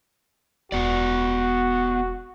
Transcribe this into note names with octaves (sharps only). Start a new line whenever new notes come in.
E1 B3 F#4 D5